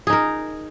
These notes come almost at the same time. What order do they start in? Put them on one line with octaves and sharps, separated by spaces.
G#4 D#4 A#4